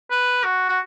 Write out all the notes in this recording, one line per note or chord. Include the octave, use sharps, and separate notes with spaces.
B4
F#4
F#4